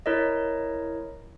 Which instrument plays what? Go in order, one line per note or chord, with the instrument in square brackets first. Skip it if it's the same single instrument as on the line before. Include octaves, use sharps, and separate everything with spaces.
[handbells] E4 A#4 C#5 D#5